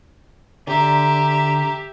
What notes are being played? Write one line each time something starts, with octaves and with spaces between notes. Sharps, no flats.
D3 G4 E5 A#5